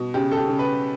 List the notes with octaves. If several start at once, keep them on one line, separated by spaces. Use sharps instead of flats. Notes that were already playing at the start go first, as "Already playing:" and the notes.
Already playing: B2
C#3 G4
A4
G4
C#3
B4